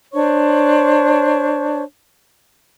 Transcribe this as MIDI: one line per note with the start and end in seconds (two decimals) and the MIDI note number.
0.14 1.83 62
0.14 1.83 72
0.14 1.83 73
0.14 1.83 85